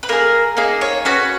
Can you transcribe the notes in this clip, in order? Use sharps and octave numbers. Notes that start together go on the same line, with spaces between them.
B4
A#3 D#4 G#4 A#4
A#3 D#4 G#4
C#5
C#4 F#4 B4